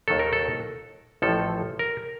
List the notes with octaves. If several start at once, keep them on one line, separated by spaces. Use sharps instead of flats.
D#2 D#3 F#3 A4
A#4
A4
A1 A2 F3 A4
A#4